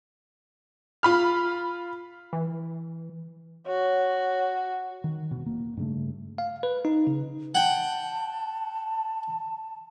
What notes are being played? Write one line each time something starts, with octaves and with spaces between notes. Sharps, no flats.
F4 B5 F6
E3
F#4 C#5
D#3
E1 B2
E1 A#3
G2 C#3 A3
F5
B4
D#4
C#3
F#5 G5 A5